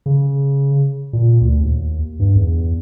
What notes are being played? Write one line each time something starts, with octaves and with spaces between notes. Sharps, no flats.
C#3
A#2
D2
D#2
G2
E2